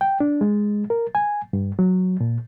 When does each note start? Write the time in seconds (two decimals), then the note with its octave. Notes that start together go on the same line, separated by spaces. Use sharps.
0.01 G5
0.20 D4
0.41 G#3
0.90 A#4
1.15 G#5
1.53 G2
1.79 F#3
2.20 A#2